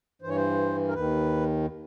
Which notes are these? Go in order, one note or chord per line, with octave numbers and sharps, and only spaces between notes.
G2 E3 C5
C#5
C5
A#4
D#2 D#3 B4